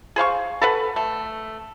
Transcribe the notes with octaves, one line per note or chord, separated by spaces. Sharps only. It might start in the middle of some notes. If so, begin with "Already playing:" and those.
G#4 C5 F5 C#6
A4 B4 F#5
A3